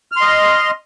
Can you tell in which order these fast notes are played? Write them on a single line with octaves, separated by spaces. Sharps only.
F6 C6 D#5